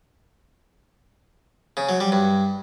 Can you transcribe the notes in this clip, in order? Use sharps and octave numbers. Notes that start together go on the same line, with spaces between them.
C#3
F#3
G3
G2